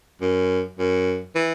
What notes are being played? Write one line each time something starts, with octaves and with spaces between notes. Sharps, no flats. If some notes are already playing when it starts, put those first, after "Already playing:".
F#2
F#2
E3